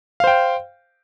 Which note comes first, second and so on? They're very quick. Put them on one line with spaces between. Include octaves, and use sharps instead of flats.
F5 C5 G5